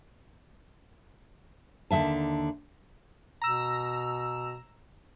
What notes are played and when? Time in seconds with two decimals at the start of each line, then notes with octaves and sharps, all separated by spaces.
1.91 D#2 D3 E3 E5 A5
3.42 B2 A#5 E6